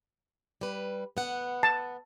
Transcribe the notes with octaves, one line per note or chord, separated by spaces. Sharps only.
G3 B4
B3 F#5
A5